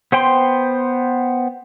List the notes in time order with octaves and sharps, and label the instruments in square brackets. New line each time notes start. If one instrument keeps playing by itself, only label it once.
[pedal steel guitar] B3 C5 G5 C6